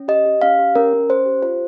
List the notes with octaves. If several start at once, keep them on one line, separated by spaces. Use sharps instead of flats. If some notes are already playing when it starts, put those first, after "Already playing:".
Already playing: C#4
G4 D#5
G4
C#4 F5
G4
C#4 A#4
C#4
C#4 C5
G4
F4 C5